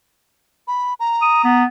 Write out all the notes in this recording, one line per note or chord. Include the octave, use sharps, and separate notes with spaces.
B5
A#5
D#6
B3